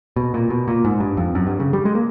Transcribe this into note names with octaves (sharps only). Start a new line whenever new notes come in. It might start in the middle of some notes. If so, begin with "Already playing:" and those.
B2
A#2
B2
A#2
G#2
G2
F2
F#2
G2
C#3
G3
G#3
A#3